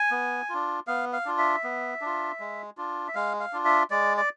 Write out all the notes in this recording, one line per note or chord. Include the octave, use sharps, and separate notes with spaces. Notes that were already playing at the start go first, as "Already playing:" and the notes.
Already playing: G#5
B3
D4 F4
B3 F5
F5
D4 F4
E5
B3
D4 F4
G#3
D4 F4
E5
G#3 F5
F5
D4 F4
E5
G#3 D5
D5